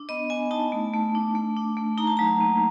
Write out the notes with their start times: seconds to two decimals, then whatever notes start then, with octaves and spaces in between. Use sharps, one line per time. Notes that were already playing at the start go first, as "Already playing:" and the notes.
Already playing: D4
0.09 B3 D#5
0.30 B3 G#5
0.51 D#4 A5
0.72 A3
0.94 A3
1.15 D4
1.35 A3
1.57 D4
1.77 A3
1.98 D#4 A#5
2.07 A5
2.17 F#3 A#5
2.41 A#3